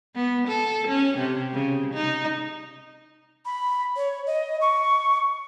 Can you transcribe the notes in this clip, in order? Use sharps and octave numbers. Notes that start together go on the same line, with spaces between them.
B3
A4
C#4
C3
C#3
D#4
B5
C#5
D#5
C#6